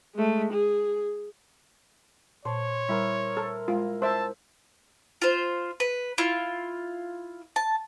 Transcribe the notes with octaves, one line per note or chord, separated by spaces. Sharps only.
G#3 A3
G#4
A#2 C5 C#5 A5
G3 E4 A#4 C5
A4 A#4
G#3 F4
C5 E5 A5 E6
F4 C5
B4
E4 F4
A5